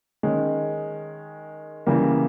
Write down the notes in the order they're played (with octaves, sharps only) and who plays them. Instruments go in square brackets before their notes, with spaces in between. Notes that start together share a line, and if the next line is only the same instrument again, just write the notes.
[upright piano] D#3 G#3 C#4
C#3 E3 G3 A#3